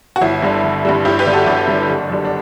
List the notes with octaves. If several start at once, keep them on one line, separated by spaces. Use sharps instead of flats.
F#4
G1 E4
G2 D3 G3
G1
G2 D3 G3
G1 E4 G4
G4 B4
G2 D3 G3
F#4 A4
G1 D4 F#4
G2 D3 G3
F#1
F#2 D3 G3
D4